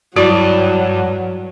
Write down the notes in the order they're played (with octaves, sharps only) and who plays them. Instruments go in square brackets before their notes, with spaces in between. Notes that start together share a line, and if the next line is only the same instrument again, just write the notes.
[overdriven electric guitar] G2 [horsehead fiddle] F#3 [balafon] E4 F#4 [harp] D5